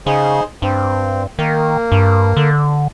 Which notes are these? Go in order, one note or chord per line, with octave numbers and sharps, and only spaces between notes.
C#3 D#4 G#4 C5
G2 C4
D#3 A#3
G2
D3